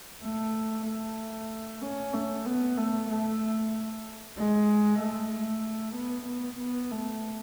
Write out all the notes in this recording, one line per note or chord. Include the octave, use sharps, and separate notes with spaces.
A3
A3
C#4
A3
B3
A3
A3
G#3
A3
B3
B3
B3
A3